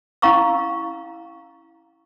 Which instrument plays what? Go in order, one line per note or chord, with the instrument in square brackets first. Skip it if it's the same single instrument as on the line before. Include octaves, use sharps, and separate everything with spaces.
[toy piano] C#4 E4 F5 A#5 C#6 E6